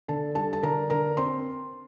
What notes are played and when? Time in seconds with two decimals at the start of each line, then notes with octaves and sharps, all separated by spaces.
0.08 D3 A4 A5
0.35 G3 A4 A5
0.53 A5
0.63 D3 A#4 A#5
0.90 D3 A#4 A#5
1.17 C4 C5 C6